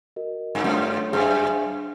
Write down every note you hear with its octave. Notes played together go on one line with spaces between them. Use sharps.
F#4 A#4 D#5
G2
F#2 A3 D4 F4 A4 C#5
F#2 G#4 C5 E5 G#5